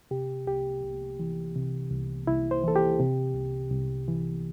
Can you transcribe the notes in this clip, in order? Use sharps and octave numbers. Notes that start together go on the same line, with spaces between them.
C3 G4
C2 G4
C2
E3
C3
C2
C2 E4
C5
E3 A4
G4
C3
C2
C2
E3